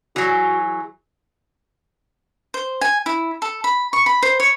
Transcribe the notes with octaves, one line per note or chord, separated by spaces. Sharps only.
E3 F#3 F#4 G#4
C5
G#5
E4
A4
B5
C#6
B5
C5
C#5